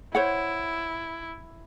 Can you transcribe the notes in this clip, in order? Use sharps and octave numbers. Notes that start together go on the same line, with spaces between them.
E4 C5 C#5 F#5